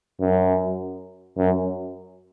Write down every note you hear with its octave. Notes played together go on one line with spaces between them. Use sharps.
F#2
F#2